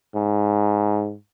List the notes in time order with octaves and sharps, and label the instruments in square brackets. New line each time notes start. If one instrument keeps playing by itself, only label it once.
[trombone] G#2